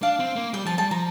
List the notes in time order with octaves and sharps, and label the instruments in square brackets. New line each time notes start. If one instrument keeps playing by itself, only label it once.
[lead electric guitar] D4 [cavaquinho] F5
[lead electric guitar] C4
A#3
[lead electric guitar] G3 [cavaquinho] G5
[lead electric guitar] F3 [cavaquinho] A5
[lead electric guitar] G3 [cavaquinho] A5
[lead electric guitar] F3 [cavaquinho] A#5